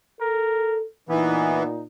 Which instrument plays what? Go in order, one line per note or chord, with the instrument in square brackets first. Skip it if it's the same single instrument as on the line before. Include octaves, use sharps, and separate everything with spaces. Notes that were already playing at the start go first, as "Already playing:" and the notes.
[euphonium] A4 [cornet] A#4
[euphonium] A#2 [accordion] E3 [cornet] B3 [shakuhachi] D#4